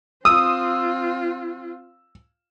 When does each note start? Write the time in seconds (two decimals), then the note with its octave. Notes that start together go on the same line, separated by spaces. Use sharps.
0.25 C4 F4 D#6 E6